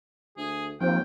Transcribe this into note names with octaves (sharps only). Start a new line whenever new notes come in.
D2 G#4
D#2 F3 A#3 C4 G5